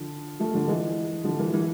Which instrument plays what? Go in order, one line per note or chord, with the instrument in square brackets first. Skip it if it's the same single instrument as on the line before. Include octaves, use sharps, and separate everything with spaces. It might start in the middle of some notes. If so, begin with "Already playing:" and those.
Already playing: [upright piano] D3 F3
F3 A3
D3 F3
E3 G#3
D3 F3
E3
E3